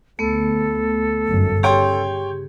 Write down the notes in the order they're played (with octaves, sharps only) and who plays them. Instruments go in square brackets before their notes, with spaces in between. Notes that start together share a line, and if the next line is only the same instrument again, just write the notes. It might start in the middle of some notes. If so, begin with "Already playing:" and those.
[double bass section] D2 [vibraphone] A3 B3 [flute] A4
[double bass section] G1 F#2
[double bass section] C#3 [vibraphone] G4 G#4 [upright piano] C#5 G5 C6